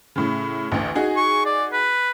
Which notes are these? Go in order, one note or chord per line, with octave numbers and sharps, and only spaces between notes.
A2 C#3
A1 D2
D#4 F#4 G#4
C#6
D5
B4